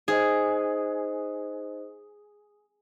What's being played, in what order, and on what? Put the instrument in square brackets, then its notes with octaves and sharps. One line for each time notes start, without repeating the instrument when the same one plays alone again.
[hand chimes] D#4 C5 D#5 [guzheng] G#4